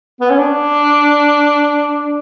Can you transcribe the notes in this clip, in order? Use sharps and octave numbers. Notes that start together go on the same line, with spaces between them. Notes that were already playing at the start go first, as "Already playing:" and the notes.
B3
C#4
D4